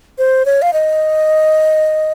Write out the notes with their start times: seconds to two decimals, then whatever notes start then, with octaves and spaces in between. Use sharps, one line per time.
0.18 C5
0.45 C#5
0.62 F5
0.73 D#5